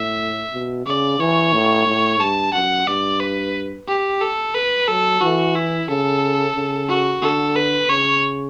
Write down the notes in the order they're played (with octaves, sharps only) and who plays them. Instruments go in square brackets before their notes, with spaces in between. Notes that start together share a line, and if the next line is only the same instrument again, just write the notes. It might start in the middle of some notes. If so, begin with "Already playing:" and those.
Already playing: [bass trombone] A2 [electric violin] E5
[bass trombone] B2
[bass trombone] C#3 [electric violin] D5
[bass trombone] E3 [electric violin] C#5
[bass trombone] A2
A2
[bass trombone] G2 [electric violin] A5
[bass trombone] F#2 [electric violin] F#5
[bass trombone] G2 [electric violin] D5
[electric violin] B4
G4
A4
B4
[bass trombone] F#3 [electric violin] A4
[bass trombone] E3 [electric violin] F#4
[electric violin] E4
[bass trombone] C#3 [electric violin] A4
[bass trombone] C#3
[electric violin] F#4
[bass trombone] D3 [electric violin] A4
[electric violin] B4
[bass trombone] C#3 [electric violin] C#5